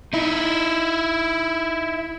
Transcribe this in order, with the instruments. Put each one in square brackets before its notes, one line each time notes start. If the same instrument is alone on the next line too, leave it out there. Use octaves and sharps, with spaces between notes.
[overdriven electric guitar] D#4 E4